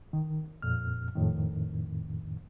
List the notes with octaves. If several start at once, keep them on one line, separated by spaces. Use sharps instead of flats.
D#3
F2 A#2 F6
F2 A2 D#3